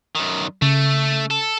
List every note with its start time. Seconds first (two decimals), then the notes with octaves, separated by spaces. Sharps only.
0.15 F#2 D#3
0.62 C#3 A3
1.31 A4